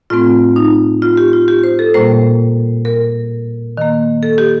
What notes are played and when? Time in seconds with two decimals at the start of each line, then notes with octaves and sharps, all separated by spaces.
0.10 A2 A3 C4 F4
0.56 D#4
1.02 F4
1.17 G4
1.33 F4
1.48 G4
1.63 C5
1.79 A4
1.94 A#2 G3 A#3 C5
2.85 A#4
3.77 D#3 A#3
4.23 A4
4.38 G4